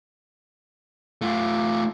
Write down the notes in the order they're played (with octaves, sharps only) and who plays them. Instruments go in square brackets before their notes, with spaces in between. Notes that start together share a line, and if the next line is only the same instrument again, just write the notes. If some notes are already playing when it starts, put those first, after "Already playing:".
[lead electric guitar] A3 F4